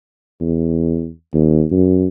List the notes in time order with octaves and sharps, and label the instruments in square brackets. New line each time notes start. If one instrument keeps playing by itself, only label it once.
[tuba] E2
D#2
F#2